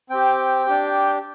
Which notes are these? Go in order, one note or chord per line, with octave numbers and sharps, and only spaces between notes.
C4 G4 G5
D4 G4